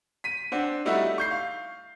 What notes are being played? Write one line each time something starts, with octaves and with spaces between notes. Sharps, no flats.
B6 D#7
C4 D4 F#5
G3 A3 D#4 E4 F#4 E5
C#6 G6 C7
F5